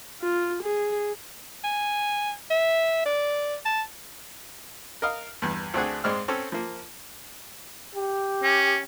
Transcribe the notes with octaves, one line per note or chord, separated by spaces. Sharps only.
F4
G#4
G#5
E5
D5
A5
A#4 D#5 F5
E2 G2
D2 A3 C4 D4 G#4 F#5
G#2 G#3 C4 D5 F6
C4 C#4 A4
F3 A#3
G4
C#4